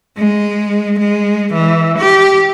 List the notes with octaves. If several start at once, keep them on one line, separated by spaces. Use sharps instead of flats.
G#3
G#3
E3
G4